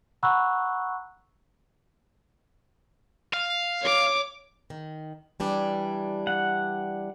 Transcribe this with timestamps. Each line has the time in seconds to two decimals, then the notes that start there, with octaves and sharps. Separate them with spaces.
0.23 F#5 A#5 B5 C#6 E6 F#6
3.33 F5
3.81 C#5 D6
4.70 D#3
5.40 E3 G3 D4
6.27 F#5